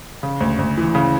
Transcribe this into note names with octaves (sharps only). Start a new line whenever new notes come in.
C#3
D2
D2
E3
C#3